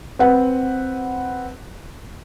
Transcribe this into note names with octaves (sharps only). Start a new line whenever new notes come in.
C4 B4 F#5